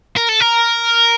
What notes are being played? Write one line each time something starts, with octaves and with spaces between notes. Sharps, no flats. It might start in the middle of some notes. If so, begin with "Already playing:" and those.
A#4
A4
A#4